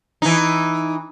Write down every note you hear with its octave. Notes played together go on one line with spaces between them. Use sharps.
E3 D#4